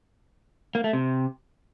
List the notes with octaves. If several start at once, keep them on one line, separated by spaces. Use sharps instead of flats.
A#3
A3
C3